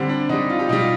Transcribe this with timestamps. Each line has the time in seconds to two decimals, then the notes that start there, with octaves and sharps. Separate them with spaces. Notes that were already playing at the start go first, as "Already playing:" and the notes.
Already playing: D3 G3 C4
0.09 D4
0.29 D3 G3 D#4
0.50 F4
0.59 G4
0.69 B2 G3 D#4
0.78 F4